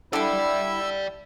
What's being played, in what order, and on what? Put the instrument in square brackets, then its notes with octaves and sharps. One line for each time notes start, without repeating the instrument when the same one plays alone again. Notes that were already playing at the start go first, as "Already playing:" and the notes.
[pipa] D3 D4 [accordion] E4 [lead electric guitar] D5 G5 [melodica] E6